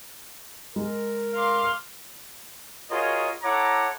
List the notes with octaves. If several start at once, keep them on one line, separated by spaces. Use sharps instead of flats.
G#3 A#4
F5 C6 D6
F4 F#4 G#4 A#4 C#5 D#5
E4 A4 C#5 F#5 A#5 D6